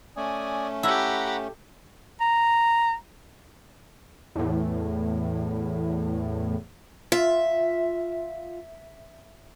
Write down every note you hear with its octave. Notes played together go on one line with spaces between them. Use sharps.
A3 C#4 D5 G#5 D#6
E4 G4 A4 F#5 A#5 B5
A#5
E2 A2
F4 E5